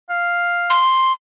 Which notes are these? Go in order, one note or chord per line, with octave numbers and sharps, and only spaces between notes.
F5
C6